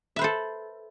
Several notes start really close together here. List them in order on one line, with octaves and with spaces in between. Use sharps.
E5 B4 C5 A4